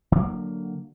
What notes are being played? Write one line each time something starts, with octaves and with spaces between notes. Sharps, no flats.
D3 F#3 G#3 A#3